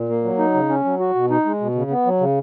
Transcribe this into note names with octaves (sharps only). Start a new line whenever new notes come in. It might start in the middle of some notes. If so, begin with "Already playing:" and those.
Already playing: A#2
A#3
F#3
D#4
C#3
C#4
F#3
F#4
B2
D#4
G#3
B2
C#3
B3
F#3
C#3